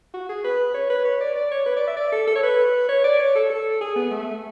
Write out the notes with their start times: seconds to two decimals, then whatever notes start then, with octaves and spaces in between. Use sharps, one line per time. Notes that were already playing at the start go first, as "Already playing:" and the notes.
0.14 F#4
0.29 G#4
0.44 B4
0.74 C#5
0.90 B4
1.05 C#5
1.20 D5
1.35 D5
1.51 C#5
1.66 B4
1.77 D5
1.87 E5
1.97 D5
2.12 A4
2.27 A4
2.36 C#5
2.43 B4
2.88 C#5
3.04 D5
3.19 C#5
3.35 A4
3.50 A4
3.81 G#4
3.96 B3
4.11 A3